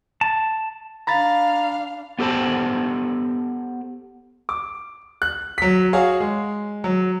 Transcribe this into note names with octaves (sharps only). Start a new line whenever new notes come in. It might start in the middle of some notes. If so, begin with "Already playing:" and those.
A5
D4 F5 A#5 B5 A6
B3 G4 A4 C5 A5 B5
D6
F#6
F#3 B6
F#4 G#4 C#5 F5
G#3
F#3